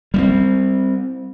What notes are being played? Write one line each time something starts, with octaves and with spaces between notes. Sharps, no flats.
G3 A#3 C4